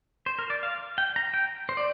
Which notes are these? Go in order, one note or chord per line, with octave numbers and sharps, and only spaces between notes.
C5
A#4
D5
F5
G5
A#5
G5
C5
D5